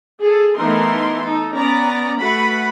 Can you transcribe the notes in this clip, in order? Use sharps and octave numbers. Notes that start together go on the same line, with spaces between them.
G#4 A4
E3 A3 B3 D#4 A#4 C6
D#4 A4
B3 C#4 D5 A#5
A3 F#4 B4 F#5 B5